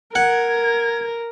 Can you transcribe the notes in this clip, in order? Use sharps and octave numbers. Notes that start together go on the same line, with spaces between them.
A#4 F#5 G#6